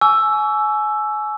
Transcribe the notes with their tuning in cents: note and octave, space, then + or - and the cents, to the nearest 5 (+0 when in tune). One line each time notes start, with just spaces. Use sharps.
G#5 +30 C#6 +40 E6 +5